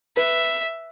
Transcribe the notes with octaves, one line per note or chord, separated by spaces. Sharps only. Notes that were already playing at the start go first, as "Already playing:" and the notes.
B4 E5